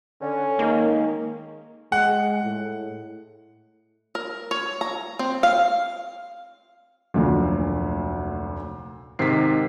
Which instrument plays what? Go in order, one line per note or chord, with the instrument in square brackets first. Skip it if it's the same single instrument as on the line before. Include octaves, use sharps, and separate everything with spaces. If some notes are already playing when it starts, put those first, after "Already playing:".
[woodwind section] D3 [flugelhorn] C#4
[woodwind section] D#3 G#3 [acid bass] A#3
[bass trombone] G#3 [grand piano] F#5
[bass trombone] A2
[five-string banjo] A#4
C#5
A#5
C4
F5
[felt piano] F1 D2 F#3 [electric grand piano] A#2
[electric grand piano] G#2 C3 D#3 [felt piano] B6 C7